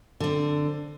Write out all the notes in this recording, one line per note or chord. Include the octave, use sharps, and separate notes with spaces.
D3 C4